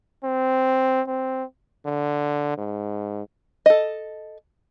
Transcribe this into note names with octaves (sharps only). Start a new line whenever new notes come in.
C4
C4
D3
G#2
A4 D#5